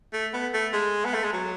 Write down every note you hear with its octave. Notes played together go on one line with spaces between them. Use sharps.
A3
B3
A3
G#3
B3
A3
G#3
F#3